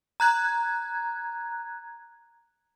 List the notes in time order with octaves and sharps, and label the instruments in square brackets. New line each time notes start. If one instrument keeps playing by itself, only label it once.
[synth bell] A#5 F#6 G#6